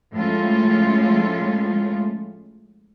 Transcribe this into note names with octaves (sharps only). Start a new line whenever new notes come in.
A2 F3 G#3 A3 C#4 F4